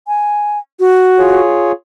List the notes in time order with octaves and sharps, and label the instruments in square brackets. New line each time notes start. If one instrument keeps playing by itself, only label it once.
[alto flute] G#5
F#4
[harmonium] F4 G#4 C#5